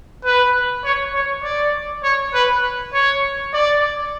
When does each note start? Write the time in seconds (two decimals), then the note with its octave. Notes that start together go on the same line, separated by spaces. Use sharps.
0.25 B4
0.85 C#5
1.14 C#5
1.44 D5
2.04 C#5
2.34 B4
2.93 C#5
3.53 D5